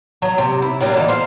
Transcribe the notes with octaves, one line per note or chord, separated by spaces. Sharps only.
F#3 A#5
C3
E4
F#3 G3 A#3 D4
D3 E3 D#4
C5 F5